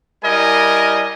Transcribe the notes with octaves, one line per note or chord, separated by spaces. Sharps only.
G3 E4 A#4 D#5 G#5